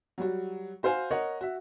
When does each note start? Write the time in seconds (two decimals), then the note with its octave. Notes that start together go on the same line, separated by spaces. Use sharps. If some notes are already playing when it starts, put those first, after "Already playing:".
0.18 F#3 G3 F#4
0.83 F#4 C5 F5 G#5
1.11 A#4 C#5 D#5 F#5
1.41 F#4 E5